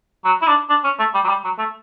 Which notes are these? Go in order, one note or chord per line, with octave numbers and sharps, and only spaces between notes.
F#3
E4
D4
D4
C#4
A3
G3
F#3
G3
F#3
A3